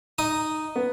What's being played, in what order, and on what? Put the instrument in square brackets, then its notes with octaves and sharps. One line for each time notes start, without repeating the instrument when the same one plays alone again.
[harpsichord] D#4 D#6
[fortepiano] B3